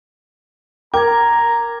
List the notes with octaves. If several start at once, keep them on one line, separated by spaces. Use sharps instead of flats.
A#4 G5 A#5 D6 G#6